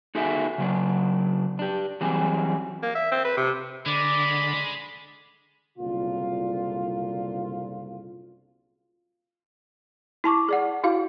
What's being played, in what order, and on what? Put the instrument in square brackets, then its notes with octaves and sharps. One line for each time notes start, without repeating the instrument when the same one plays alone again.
[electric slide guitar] D#4 F#4 G#4 A4 E5
C#3 F#3 D4
D4 G4
E3 F#3 G3 C4 G#4
[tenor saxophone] A#3
E5
C4
B4
C3
[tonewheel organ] D3 [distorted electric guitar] G#3 [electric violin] D5 [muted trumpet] B5
[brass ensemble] F#1 C2 A#2 D3 F4
[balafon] E4 A5 C#6 D6
G#4 D5 F#5
E4 F#4 F5